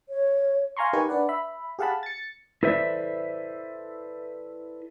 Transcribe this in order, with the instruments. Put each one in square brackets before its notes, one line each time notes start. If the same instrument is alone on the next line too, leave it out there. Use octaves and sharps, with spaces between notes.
[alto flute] C#5
[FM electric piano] F5 G#5 A#5 C6 C#6
D#4 G4 A#4 B4 G#5 C#6
D4 B4 D5 F#5
E5 B5
G4 G#4 F5 F#5 A5 B5
A6 C#7
[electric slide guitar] E4 A4 B4 C5 D5 E5